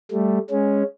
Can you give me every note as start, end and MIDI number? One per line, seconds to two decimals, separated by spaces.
0.11 0.39 55
0.11 0.39 57
0.51 0.83 56
0.51 0.83 61